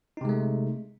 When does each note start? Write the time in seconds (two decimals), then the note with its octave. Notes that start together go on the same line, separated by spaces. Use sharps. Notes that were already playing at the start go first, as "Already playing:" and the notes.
0.17 D#4
0.21 C3
0.25 G#3
0.29 A3